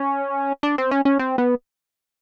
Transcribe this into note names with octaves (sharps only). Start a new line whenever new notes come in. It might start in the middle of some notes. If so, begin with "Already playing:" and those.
Already playing: C#4
D4
C4
C#4
C#4
C4
B3